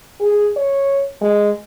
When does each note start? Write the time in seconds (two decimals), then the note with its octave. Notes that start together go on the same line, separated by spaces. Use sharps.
0.20 G#4
0.57 C#5
1.21 G#3